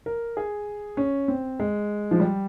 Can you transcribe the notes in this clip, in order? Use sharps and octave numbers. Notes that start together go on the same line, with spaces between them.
A#4
G#4
C#4
C4
G#3
F3
G3